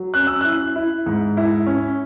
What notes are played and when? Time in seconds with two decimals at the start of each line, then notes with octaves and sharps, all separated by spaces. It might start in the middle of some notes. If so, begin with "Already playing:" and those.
Already playing: F#3
0.14 C#4 F#6
0.27 E6
0.41 E4 F#6
0.76 E4
1.06 G#2
1.37 E4
1.66 C#4